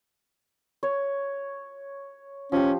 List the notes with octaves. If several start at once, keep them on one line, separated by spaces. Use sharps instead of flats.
C#5
F3 C#4 G4